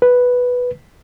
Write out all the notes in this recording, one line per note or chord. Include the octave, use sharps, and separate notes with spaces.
B4